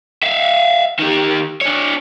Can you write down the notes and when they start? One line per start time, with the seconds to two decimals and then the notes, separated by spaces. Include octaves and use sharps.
0.23 E5 F5
0.99 D#3 G4
1.61 D4 C#5